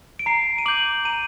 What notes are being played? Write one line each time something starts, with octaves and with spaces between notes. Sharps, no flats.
D7
A#5 C7
D#7
D6 G6 F#7
A#5 D#7